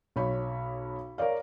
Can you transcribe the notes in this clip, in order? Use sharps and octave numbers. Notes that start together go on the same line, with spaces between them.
B1 C#5 B5
A#4 C#5 D5 F5